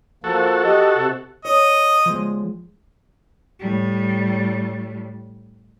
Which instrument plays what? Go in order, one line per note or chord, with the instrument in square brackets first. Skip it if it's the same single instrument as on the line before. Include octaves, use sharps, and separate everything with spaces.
[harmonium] F3 A#3 [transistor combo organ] F#4 A4
[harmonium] G4 D#5
C3
[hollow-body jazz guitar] C#5 [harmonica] D#5
[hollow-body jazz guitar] F3 G#3
[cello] A2 G3